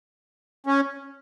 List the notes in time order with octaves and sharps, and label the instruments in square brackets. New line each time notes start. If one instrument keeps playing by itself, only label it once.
[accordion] C#4